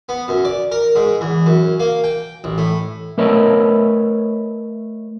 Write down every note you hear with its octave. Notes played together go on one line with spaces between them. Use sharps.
B3
F#2
D5
A#4
G#2
E2
F#2
A#3
G5
A1
A2
A3 A#4 B4 C#5 D#5